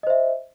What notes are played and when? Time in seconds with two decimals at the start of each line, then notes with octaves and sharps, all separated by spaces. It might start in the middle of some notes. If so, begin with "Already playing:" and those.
0.03 D#5
0.07 C5
0.10 E5